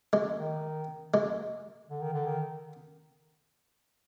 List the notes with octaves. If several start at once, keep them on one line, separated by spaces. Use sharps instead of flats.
G#3
D#3
G#3
D3
D#3
D3
D#3